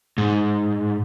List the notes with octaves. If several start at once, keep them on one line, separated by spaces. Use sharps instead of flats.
G#2